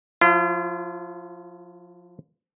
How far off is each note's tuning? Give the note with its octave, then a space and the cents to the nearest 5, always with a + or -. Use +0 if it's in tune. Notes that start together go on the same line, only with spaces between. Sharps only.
F3 +25 F4 -45